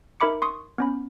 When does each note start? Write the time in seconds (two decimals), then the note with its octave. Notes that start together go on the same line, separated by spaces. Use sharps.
0.20 D#4 A#4 E5 B5 D6 C#7
0.42 C6 C#6 D#6
0.78 B3 C#4 B5